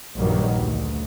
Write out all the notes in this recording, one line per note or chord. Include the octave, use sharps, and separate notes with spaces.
A#1 G2 A#2 D#3 F#3 G3
D2